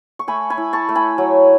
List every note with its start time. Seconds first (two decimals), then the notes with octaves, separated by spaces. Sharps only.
0.19 C#6
0.28 A3 G#5 B5
0.50 G#5 B5
0.58 E4
0.73 A5 C#6
0.89 A3
0.95 G#5 B5
1.18 F#3